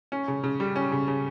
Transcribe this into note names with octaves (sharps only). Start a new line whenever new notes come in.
C#4
C#3
C#3
G3
C#4
C#3
C#3